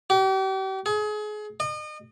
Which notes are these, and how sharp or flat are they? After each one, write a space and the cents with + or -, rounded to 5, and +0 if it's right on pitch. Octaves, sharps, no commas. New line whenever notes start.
G4 -40
G#4 +30
D#5 -35